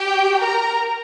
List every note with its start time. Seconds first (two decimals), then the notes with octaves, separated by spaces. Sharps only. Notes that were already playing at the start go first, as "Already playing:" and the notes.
Already playing: G4 G5
0.41 A#4 A#5